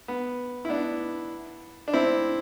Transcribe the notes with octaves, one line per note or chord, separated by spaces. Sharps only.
B3
E4
B3 D4
D4
C4 E4